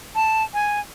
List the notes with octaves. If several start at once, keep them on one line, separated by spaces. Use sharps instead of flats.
A5
G#5